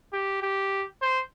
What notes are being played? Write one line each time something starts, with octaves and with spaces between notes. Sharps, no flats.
G4
G4
C5